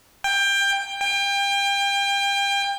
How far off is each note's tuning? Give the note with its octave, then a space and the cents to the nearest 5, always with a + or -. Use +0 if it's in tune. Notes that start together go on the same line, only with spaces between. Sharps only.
G5 +20
G5 +30